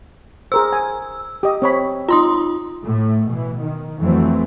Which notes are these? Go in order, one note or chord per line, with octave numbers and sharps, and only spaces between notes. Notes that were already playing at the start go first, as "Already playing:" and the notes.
G#4 A#4 C5 E6
G#5
G4 D#5
C4 C#5 B5
D#4 F4 A#5 C6 D#6
A2 A3
B2 E3
D#3
F2 E3 F#3 A3 C4